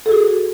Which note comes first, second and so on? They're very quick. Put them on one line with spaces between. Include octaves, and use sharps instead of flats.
A4 G#4 F#4